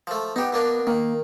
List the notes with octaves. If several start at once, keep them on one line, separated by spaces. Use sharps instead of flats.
F3 A3
B3 D#4 G4
B2 A#3 D4
D#3 A#3